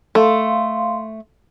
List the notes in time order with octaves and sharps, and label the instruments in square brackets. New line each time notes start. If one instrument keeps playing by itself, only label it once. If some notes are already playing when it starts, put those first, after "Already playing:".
[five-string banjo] A3 [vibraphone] F5 C6